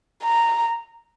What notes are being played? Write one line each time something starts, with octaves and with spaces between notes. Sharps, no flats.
A#5